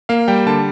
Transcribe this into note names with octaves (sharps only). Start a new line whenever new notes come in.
A#3 F5
G3 G5
D3 A5